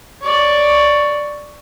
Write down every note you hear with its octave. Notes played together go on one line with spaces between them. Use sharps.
C#5 D5